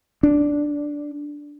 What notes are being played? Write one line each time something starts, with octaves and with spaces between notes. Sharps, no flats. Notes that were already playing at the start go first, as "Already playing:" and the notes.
D4